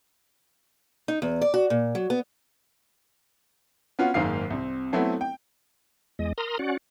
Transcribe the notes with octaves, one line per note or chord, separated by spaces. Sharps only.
D#4
E2
D5
F#4
A#2
F#3
B3
B3 C#4 F4 F#4
F#1 G#2 D#3 A#3 F5 C7
C2 C4
F#3 A3 B3 C4 E4
G5
E2 G#3 D#5
A#4 A#5 C6 D#6
C#4 F#4 D5 F#5